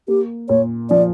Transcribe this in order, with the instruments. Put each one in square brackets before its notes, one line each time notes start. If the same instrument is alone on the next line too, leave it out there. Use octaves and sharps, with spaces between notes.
[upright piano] A#3 [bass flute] G4
[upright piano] A#2 [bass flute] C#5
[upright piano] F3 [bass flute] D5